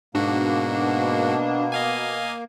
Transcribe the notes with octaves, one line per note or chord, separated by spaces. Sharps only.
G#2 B2 A#3 D4 F#4
D#5 F5 G#5